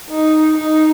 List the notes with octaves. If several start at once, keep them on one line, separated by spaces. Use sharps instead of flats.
D#4
D#4